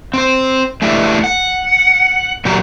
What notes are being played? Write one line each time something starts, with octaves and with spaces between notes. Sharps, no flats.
C4 C5
A3 D4 E4 F#4 G4 B4
F#5
A#2 F#3 G4 A#4